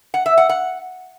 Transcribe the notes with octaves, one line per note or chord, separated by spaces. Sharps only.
F#5
E5
F#5
F#5